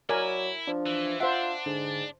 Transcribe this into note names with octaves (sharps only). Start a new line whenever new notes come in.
F#3 E4 A#4 D5 G#5
F3 D4
E3
D4 F4 C5 E5 F#5
G#2 D3